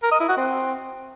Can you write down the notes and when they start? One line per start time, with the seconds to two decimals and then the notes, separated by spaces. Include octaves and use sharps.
0.03 A#4
0.12 D#5
0.20 E4
0.29 F#4
0.37 C4